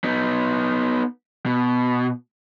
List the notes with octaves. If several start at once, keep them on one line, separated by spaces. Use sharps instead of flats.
B3 D#4
B2